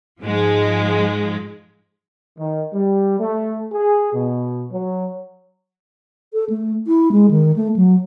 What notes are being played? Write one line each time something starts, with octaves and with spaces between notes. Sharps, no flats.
G#2 F3 G#3
D#3
G3
A3
G#4
B2
F#3
A4
A3
E4
G#3
D#3
A3
F#3